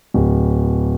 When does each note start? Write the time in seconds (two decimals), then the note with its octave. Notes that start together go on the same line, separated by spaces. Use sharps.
0.14 D1